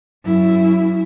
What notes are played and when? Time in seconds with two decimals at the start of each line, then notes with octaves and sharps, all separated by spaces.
0.24 F#2 E4